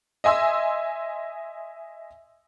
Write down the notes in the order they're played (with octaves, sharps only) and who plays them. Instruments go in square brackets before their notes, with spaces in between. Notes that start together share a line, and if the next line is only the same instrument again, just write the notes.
[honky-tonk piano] D#5 E5 G#5 C6 E6